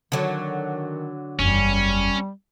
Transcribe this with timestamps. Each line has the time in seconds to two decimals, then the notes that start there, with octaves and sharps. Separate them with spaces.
0.12 D3 D#3 F#3
1.39 F#1 E2 G3 C#4